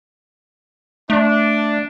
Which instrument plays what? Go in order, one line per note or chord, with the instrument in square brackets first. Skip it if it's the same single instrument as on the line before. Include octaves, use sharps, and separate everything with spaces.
[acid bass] A3 [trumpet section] D4